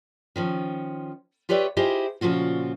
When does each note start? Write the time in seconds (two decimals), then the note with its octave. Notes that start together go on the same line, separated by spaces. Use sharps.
0.36 D#3 F3 C#4
1.49 F4 G4 B4 C#5 D5 E5
1.77 E4 F4 G4 G#4 C5 D#5
2.21 A#2 C#3 F3 F4 F#4